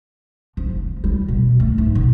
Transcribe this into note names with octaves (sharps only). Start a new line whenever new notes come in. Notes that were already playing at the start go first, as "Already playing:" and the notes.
F3
F1
G3
B2
A3
G#2
B2